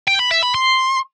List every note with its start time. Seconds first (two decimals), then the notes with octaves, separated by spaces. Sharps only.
0.07 G5
0.19 B5
0.31 E5
0.43 B5
0.55 C6